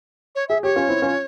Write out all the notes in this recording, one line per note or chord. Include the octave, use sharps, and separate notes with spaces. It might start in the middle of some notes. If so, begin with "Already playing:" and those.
C#5
G#4 E5
G4 C#5
C#4 F4
C4 E4
C#4 F4